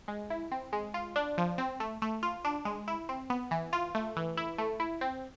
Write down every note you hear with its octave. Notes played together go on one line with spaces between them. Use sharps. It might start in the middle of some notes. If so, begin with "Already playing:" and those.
G#3
E4
C4
G#3
F4
D4
F3
C4
A3
A3
F4
D4
G#3
E4
C4
B3
E3
F4
A3
E3
E4
A3
E4
C4